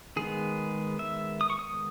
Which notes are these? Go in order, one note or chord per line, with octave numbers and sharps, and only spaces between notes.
D#3 G#3 B3 G#4
E5
D#6
C#6
D#6